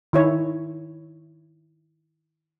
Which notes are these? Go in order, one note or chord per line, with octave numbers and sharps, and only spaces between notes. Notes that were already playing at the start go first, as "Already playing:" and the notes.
D#3 E4 C#5